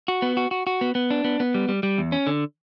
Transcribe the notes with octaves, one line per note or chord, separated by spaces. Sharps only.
F#4
B3
F#4
F#4
F#4
B3
B3
D4
B3
B3
G3
G3
G3
E2
C#4
D3